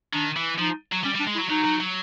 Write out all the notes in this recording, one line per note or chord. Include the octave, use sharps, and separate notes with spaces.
D#3 D4
E3
F3 D#4
F#3
G3 C#4
G3
D4
G#3
E4
F#3
F#3 D#4
F#3
F#3